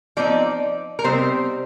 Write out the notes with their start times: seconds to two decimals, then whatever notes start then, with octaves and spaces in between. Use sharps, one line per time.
0.17 F3 C4 D#4 D5
0.99 A#4
1.04 C3 G3 C4 D#4 C5